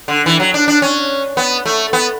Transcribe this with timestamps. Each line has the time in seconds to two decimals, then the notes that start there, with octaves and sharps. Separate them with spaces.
0.08 D3
0.26 E3
0.40 F#3
0.54 D4
0.68 D4
0.82 C#4
1.37 B3
1.65 A3
1.93 B3